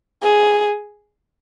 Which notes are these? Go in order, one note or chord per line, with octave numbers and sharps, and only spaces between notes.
G#4